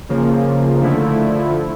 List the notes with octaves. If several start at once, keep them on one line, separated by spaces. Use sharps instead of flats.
C#3 F3 A#3
D3 F3 A3 E4